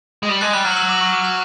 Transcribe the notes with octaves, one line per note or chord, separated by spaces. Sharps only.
G#3
G3
G#3 F#6
G3 F#6
F#3 F6
E6
D6
C#6
D6
E6